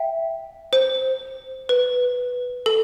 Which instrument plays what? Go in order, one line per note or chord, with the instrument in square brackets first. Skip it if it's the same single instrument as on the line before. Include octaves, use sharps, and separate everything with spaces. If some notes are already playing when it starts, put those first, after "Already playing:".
Already playing: [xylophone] E5 G5
C5
B4
A4